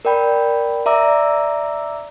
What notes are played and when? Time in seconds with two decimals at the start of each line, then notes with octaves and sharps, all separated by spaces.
0.05 A#4 D5 G5 B5 G6
0.86 D5 E5 A#5 D6 E6